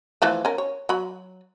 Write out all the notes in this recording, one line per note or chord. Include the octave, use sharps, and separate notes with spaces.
E3 F3 A3
C#4 A#4
C#5
F#3 B5